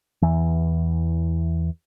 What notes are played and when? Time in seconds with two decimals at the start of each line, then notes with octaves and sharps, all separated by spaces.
0.22 E2 E3